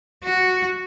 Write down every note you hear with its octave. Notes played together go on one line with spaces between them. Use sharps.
F#4